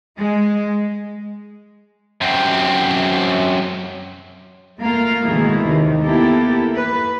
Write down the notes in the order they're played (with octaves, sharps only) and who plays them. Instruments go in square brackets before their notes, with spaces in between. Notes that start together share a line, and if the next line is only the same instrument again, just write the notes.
[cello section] G#3
[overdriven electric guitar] F#2 C4
[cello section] A3 A#3 F4 F5
G#2 B2 D#3 A3 E4 G#4
D#2 C3 D#3
A#3 B3 E4 G4 A4
B4